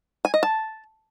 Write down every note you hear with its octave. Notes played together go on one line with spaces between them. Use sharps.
G#5
D#5
A5